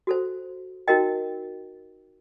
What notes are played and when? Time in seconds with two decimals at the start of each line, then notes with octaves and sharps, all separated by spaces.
0.07 F#4 A4 C5
0.88 D#4 F#4 A#4 D#5 G5